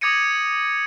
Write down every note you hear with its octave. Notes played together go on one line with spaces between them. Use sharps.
D6 D#6 G#6 A#6 C#7 D#7